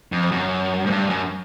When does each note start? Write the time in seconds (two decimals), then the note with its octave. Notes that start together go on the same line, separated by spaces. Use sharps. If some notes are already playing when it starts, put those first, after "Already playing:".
0.12 F2
0.31 F#2
0.86 G#2
0.90 G2
1.10 F#2